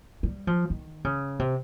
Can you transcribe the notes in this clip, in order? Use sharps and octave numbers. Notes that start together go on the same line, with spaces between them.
G3
F3
D#3
C#3
C3